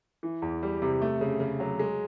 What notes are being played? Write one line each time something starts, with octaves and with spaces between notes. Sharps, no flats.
E3
E2
G3
C3
A3
C#3
C#3
F#3
G#3